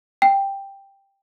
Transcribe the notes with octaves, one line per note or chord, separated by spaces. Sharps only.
G5